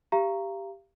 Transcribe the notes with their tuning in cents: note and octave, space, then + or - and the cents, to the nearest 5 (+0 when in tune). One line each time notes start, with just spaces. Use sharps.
G4 +5 F5 -30 A#5 +0